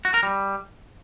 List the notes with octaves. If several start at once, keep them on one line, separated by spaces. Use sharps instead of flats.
F#4
A#4
G3